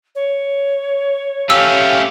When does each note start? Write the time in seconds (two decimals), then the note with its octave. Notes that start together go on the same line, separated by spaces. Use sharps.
0.15 C#5
1.50 A3 C#4 G4 F5 E6